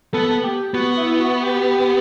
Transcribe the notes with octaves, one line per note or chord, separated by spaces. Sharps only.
B3 A4
G4
B3 F#4
E4
F#4
G4